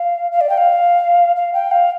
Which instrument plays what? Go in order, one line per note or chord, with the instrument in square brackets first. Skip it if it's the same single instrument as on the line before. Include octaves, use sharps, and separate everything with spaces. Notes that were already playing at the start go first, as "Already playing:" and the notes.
Already playing: [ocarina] F5
F5
D5
G5
F5
F5
G5
F5